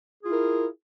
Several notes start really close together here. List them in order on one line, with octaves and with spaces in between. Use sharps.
G#4 F4 E4 A#4